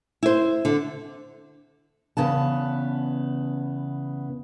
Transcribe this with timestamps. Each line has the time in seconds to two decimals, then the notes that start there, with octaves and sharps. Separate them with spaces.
0.23 E4 C5
0.65 D3
2.17 E2 C#3 B3 A5